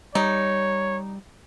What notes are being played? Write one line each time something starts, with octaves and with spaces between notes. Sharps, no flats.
G3 D#4 C#5